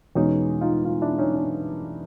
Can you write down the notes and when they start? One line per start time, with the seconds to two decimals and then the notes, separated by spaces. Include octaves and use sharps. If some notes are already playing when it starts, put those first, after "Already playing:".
0.15 E2 B2 G#3 C#4 D#4
0.61 D#4 F4
0.85 D#4 F4
1.01 D4 E4
1.18 C#4 D#4
1.35 D4